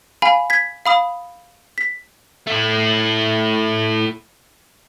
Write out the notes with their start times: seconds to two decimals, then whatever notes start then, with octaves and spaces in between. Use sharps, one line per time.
0.22 F5 G#5 B5
0.50 G#6 B6
0.86 F5 B5 D#6
1.78 B6
2.47 A3 E4